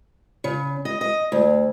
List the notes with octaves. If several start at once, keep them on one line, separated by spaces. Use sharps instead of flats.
C#3
D#5
D#5
D2